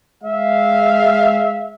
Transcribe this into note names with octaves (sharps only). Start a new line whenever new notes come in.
G#3 E5 F5